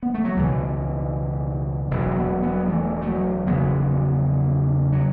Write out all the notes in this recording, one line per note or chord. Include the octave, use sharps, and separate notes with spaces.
B3
A3
F#3
C#2 B2 E3
E1 E2 B2 F#3
F#3 B3
F#3 B3
E3 A3
A3
F#3
F#1 E2 C#3 F#3 B3
F#3